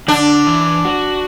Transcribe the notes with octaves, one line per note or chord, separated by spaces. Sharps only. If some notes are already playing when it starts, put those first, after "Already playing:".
D3 D4
E3
F#4